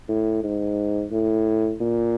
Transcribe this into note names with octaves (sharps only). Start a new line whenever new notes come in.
A2
G#2
A2
A#2